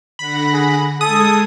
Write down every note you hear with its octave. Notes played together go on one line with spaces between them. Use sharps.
D3 F#5 B5 A#6
G#4
G#3 A4 D#6 G#6